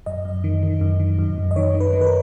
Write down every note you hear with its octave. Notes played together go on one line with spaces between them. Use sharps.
F#2 D#5
F#2
D#3
D#3
F#2
D#3
F#2
F#2
D#5
D#3 C#5
D#3
B4
D#3
B4
A#4